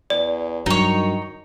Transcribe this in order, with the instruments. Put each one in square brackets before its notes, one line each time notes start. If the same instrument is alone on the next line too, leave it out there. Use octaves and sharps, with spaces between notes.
[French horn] E2 [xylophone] D5
[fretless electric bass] G2 F#3 [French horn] D#3 [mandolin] D#4 C#5